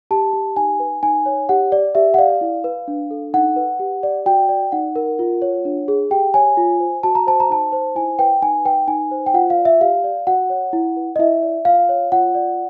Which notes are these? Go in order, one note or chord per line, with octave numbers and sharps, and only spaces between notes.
G4 A5
G4
D#4 G#5
B4
D#4 G#5
C#5
G4 F#5
D5
G4 E5
F#5
D5 F5
E4
B4
D4
A4
D#4 F#5
B4
G4
D5
F#4 G5
D5
D#4 F#5
A#4
F4
C#5
D4
G#4
G4 G5
C#5 G#5
F4
C5
F#4 A5
A#5
C5 A5
A#5
D#4 A5
C5
E4 G#5
B4 G5
D#4 G#5
B4 G5
D#4 G#5
C5
G5
F4 F#5
F5
D5
E5
G4 F5
D5
F#4 F#5
C#5
E4
B4
D#5
E4 E5
D5
F4 F5
C#5
F4 F#5
D5